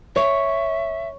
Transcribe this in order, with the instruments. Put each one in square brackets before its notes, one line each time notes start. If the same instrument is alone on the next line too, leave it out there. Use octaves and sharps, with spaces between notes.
[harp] C#5 [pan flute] E5